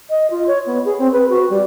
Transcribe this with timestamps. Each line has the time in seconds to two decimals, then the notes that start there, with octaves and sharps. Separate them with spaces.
0.10 D#5
0.30 F4
0.47 C#5
0.66 B3
0.85 G#4
0.98 C4
1.12 B4
1.29 F#4
1.49 G3